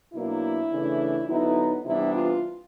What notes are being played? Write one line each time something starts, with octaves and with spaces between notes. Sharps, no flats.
B2 F#3 A#3 D4 E4
C#3 E3 A3 D4
D3 F#3 B3 D#4 E4
C3 E3 G3 B3 D4 E4
F4